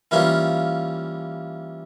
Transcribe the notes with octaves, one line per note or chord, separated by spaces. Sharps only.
E3 G3 A#3 C#4 F4